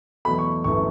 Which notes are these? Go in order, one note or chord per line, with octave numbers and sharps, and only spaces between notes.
E2 B2 F#3 A3 B5
C#6
G1 F#2 E3 A3 C#6